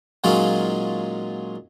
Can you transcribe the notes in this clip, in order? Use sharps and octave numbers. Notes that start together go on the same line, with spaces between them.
A#2 F#3 G#3 C#4 D#4 F4